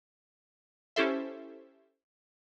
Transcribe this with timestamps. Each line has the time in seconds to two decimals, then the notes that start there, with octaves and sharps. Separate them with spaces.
0.96 C#4 E4 G4 A4 C5 E5